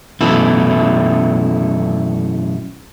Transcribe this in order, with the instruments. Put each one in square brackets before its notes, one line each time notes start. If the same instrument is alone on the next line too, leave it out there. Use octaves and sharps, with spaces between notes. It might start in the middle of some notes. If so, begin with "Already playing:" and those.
[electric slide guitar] F#2 B2 E3 A3 E4